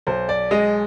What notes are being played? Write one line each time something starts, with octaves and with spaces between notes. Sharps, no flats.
B1 C5
D5
G#3 D#5